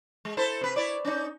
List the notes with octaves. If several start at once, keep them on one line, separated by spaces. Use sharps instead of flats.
G#3
E4 A4 C5
C3 B4
E4 C#5 D5
C#4 D#4